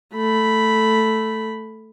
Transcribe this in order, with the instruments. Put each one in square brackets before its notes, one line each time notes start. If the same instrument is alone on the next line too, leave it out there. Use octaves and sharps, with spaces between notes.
[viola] A3 B5